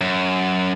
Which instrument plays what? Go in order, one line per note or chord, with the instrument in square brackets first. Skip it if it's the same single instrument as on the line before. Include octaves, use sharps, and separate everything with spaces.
[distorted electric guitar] F#2